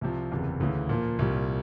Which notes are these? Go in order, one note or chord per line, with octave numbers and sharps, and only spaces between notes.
C2 C3 F3
F#1 E2 C3
D2 C#3 E3
A#2 F3 A#3
C2 A#2 G3